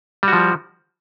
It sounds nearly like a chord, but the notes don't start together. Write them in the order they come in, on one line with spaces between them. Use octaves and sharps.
G3 F#4 F3